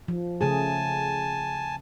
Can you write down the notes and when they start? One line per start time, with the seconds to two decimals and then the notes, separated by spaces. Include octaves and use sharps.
0.08 F3
0.41 C#3 A3 G#4 G#5 A5